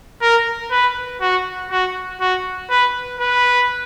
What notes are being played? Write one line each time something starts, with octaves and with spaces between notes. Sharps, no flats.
A#4
B4
F#4
F#4
F#4
B4
B4